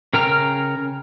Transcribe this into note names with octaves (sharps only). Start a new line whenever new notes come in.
C#3 A#4 G5 A#5 F6